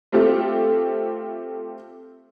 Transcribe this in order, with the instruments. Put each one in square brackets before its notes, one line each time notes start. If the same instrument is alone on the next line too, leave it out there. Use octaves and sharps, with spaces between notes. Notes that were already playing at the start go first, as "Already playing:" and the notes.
[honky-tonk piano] A3 C4 F4 G4 A4